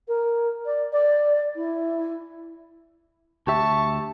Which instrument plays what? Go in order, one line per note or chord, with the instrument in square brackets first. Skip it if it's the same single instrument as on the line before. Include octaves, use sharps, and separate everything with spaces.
[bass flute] A#4
D5
D5
E4
[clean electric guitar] D2 G4 E5 [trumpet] A5 [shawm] C#6